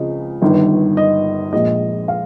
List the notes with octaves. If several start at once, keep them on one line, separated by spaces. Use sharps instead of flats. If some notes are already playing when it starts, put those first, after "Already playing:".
Already playing: C#2 C#3 F3 C4 D#5
G1 G2 D#3
D#5
A#1 A#2 F3 G#3 D#5
F5